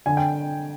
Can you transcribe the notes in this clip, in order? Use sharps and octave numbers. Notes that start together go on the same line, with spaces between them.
D3 G#5
G5